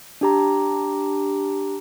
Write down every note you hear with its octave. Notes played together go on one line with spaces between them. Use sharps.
D4 G4 A#5